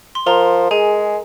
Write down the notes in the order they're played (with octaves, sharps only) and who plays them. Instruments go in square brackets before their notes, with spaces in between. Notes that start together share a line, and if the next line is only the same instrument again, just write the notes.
[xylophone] C6
[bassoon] F3 [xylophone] A#4 A#5
[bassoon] G#3 [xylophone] G#4 G#5